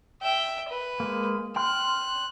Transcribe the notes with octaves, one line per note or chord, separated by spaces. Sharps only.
E5 G5
B4
G#3 A#3
G5 C6 F6 F#6